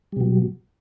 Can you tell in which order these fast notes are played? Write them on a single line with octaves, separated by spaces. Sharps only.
G3 B2 F#3